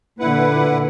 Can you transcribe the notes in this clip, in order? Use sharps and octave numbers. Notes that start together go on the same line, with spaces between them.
A#2 D3 E4 B4 F#5